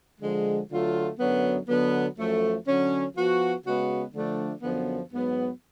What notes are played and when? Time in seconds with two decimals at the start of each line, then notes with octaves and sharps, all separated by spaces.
0.20 D3 F3 G#3
0.70 D3 F#3 A3 F4
1.19 F#2 D3 F#3 B3
1.67 D3 F#3 B3
2.16 F#2 F3 A3
2.66 D3 F#3 C#4
3.14 F3 B3 F#4
3.63 C#3 G#3 B3 F#4
4.12 D3 F3 A3 D4
4.61 F#2 D3 F3 B3
5.10 G#2 F#3 B3